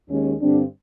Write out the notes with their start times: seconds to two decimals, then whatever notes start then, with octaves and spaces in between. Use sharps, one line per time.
0.10 D#2 D#3 G#3 C#4
0.40 G2 D3 G3 C4 D4